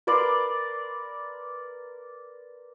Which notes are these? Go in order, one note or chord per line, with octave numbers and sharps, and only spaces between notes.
A#4 B4 D5 C6